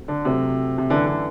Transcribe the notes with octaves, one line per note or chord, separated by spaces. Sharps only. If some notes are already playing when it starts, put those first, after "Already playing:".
Already playing: F#3 A3 C4 F#4
D3
C3 F#3 A3 C4 F#4
C3
F#2 D3 E3 A3 E4 B4
D3